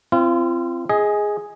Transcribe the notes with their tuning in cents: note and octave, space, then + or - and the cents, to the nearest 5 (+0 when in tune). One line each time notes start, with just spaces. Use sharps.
C4 +0 F4 -35
G#4 +0 D#5 +20